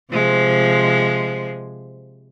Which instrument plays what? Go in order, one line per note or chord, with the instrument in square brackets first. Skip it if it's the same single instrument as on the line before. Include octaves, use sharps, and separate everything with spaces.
[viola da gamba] C3 F3 G#3